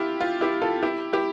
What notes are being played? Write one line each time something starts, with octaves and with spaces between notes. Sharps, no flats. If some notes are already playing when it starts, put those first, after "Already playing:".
Already playing: E4 F4 G4
F4
E4 G4
F4 A4
E4 G4
E4 G4